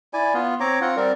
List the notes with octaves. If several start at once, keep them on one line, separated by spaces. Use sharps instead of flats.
E4 D5 G#5
B3 F4
C4 C#5 A#5 D6
C4 F4 F#5
G3 C4 A#4 D5